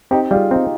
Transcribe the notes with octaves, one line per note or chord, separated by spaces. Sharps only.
C4 D#4 G4
G3 F4 G#4
C4 D#4 G4